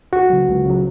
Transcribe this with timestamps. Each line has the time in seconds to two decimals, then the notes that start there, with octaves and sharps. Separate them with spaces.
0.13 C#2 F#4
0.30 C#3 F#3
0.48 C#2
0.65 C#3 F#3